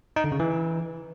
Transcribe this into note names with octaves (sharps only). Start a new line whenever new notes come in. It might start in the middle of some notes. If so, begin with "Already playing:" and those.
D#4
D3
C#3
E3